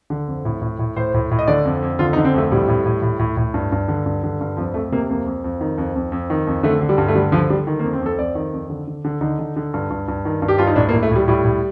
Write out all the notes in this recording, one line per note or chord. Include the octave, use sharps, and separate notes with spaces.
D3
F2
A2
A2
A2
A2 C5
A2
A2
D#5
D3 D5
F2
F2
D3 F4
D#4
D3
C4
F2 A3
A2 G3
A2
A2
A2
A2
A2
G2
G2
D3
G2
D3
G2
F2 F3
F2 A3
C3 A#3
F2 A#3
F2
F2
D#3
F2
F2
F2
D#3
F2
D3 A3
D3
G3
G2
A3
D3 G3
D3 F3
D3 G3
D#3
A#3
F2
C4
F2 A4
F2 D5
D#3
F2
D3
D3
D3
D3 D#4
D3
D3
G2
G2
G2
D#3
G2
G4
G2 F4
D#4
A2 D4
A#3
A2
A3
A2 G3
A2 G3
A2